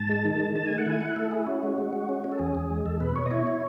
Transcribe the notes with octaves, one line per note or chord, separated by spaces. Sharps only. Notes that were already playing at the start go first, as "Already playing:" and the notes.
Already playing: G#2 A5
G#3
D#3
G#3
D#3 A5
A3 G#5
F#5
E4 G#5
E4 F#5
A3 A4
E4 G#4
C#4 F#4
G#3
G#3
G#3
C#4
C#4
A4
E2 G#4
E2
G#3
E2 A4
B2 B4
B2 C#5
D#5
E4 C#5
E4